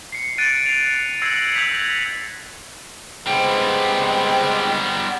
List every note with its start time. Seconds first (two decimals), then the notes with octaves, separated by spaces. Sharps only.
0.12 C7 C#7
0.38 F#6 A6 D7 D#7
0.66 C7 D7 F7
1.22 E6 G#6 A#6 C7 C#7 F#7
1.54 E6 G6 G#6 B6 F7
3.27 G3 G#3 B3 C4 G5